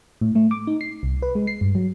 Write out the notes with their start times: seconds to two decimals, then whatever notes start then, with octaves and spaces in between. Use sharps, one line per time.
0.21 A2
0.35 A3
0.51 D6
0.67 D#4
0.81 C7
1.03 C2
1.22 B4
1.35 G#3
1.47 C7
1.61 G2
1.75 F#3